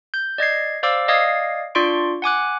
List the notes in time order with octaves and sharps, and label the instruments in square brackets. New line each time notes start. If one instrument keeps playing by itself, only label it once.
[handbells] G6
D5 D#5 G#6 C7
C5 D5 F5 D6 E6
D5 D#5 F5 D#6 G#6 C7
D4 F4 D5 C6 C#6 D7
F#5 G#5 D6 F#6